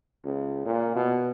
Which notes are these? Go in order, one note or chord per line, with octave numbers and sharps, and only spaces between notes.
C#2
A#2
B2